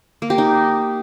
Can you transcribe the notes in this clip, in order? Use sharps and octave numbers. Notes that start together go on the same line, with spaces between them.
A#3
G4
D#4